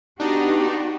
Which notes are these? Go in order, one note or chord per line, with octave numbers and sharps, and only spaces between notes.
B3 D4 D#4 F#4 G4